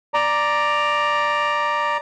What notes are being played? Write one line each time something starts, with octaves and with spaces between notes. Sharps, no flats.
D5 A#5